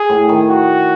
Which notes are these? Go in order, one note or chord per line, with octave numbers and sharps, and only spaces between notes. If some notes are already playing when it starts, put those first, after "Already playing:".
Already playing: G#4
A2
D#3
F#4